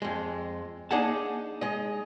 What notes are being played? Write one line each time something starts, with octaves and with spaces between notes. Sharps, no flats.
F2 G#3
A#3 D4 D#4 G#4 F#5 A5
G#3 D#5